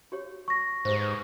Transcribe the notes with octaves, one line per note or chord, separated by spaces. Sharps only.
F#4 G4 C#5
C#6 A#6
G#2 G4 B4 C5